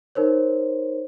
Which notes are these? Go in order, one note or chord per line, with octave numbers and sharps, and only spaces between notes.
D#4 A#4 C5 C#5